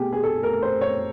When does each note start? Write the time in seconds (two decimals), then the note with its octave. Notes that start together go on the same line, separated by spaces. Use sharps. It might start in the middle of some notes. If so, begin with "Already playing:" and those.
Already playing: B2 A3 G4 G#4
0.13 G#4
0.24 A4
0.43 A#4
0.62 C5
0.81 C#5